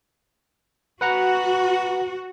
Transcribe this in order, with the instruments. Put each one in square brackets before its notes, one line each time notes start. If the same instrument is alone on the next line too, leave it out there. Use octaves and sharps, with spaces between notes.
[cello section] F#4 [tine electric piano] B4 F#5 A#5